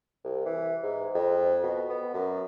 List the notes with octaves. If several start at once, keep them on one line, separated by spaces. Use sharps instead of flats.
C2
E3
G#2
F2
B2
B3
F#2